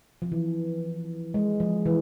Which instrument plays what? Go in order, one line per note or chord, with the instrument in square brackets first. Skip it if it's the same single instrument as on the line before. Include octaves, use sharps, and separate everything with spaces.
[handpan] F3
E3
G#3
F3
E3